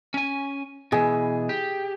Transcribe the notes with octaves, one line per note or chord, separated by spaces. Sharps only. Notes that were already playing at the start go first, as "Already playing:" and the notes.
C#4 G#5
B2 E3 G#4
G4